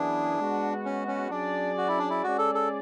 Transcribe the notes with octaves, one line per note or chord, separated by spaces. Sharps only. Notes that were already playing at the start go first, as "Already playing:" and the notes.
Already playing: F#2 E3 B3 D4 E4 G#4
G#3 B3 F#4
C#4
C#4
F#3 C#4 D4 G#4 D5
F#4
E4
D4
E4
G#3 C#4 F#4 G#4 D5
A4
A4